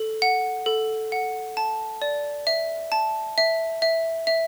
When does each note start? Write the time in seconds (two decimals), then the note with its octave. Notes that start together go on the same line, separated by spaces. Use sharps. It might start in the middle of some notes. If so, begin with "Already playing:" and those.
Already playing: A4
0.22 F#5
0.66 A4
1.12 F#5
1.57 A5
2.02 D5
2.47 E5
2.92 A5
3.38 E5
3.82 E5
4.27 E5